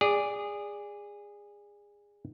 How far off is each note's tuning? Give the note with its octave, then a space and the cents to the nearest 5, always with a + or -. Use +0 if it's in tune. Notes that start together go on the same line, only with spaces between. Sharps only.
G#4 -20 D5 +0